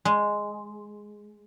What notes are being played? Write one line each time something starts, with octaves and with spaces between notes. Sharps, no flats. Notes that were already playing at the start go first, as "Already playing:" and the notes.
G#3